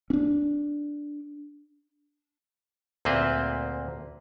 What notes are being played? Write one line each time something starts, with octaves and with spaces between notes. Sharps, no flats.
C#4 D4
D2 A#2 A#3 C4 B4 C5